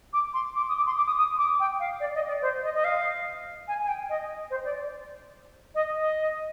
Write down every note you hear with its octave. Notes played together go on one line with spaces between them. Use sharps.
D6
C6
D6
D#6
D6
C6
D6
D#6
D#6
D6
G5
F5
D5
D#5
D5
C5
D#5
D#5
F5
G#5
G#5
G5
D#5
C5
D5
D#5
D#5